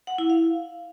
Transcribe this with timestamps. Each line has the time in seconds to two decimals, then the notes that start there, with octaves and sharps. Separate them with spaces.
0.07 F#5
0.18 E4
0.30 F5